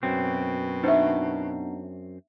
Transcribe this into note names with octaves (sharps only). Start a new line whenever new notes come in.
F#2 B2 C4
B3 D4 D#4 C5 E5